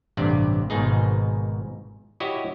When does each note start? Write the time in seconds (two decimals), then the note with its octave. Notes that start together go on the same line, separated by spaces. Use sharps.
0.17 A1 G2 C3 D5
0.70 G#1 G#2 B2 D#4 G#4
2.20 E4 F#4 G4 C#5 D#5